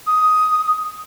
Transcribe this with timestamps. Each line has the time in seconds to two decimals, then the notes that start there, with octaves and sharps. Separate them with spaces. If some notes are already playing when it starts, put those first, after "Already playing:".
0.07 D#6